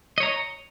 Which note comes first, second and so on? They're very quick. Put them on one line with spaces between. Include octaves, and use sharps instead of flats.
D#5 C#5 A#5